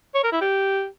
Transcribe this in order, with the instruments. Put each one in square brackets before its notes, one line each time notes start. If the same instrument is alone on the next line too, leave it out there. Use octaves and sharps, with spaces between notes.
[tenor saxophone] C#5
A#4
E4
G4